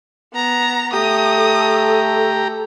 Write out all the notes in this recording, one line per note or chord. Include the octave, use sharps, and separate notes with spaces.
B3 A#5
A3 G4 A#5 D#6
A4